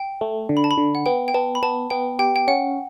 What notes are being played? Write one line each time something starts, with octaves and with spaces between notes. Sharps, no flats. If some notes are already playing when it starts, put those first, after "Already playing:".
Already playing: G5
A3
D3
B5
A5
B5
D3
F#5
B3 G5
G5
B3 A5
B5
B3 A5
B3 G5
G4 G5
G5
C#4 F#5